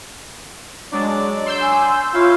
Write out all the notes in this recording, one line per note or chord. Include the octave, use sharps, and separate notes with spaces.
F#3 G#3 D4 D5 D6
C6 E6 G6
G#5
C#4 E4 F4 F5